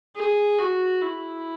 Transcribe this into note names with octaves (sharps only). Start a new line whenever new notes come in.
G#4
F#4
E4